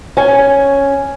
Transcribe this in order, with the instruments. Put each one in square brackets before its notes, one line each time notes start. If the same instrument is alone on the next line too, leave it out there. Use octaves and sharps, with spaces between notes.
[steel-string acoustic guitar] C#4 G#5